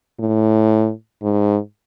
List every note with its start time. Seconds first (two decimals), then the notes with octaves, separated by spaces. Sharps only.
0.20 A2
1.22 G#2